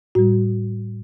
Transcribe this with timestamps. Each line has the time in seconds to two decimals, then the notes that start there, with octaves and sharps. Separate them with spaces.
0.15 A2 G3 F#4